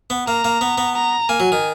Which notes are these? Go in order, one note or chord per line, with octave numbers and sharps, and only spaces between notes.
B3
A#3 A#5
A#3
B3
B3
A#5
A#3 G#5
F#3
D#3